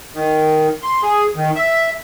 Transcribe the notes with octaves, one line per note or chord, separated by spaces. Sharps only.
D#3
C6
G#4
D#3
E5